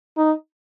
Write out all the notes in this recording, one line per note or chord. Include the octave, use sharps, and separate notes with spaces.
D#4